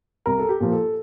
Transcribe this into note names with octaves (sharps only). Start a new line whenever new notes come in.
C2 A#4
A4
G4
A#2 F3 A#3
A4